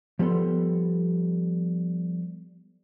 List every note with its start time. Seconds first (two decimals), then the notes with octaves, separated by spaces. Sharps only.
0.19 F3 G3 B3 A4 C6